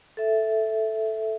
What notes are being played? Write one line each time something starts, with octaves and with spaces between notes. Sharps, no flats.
A4 E5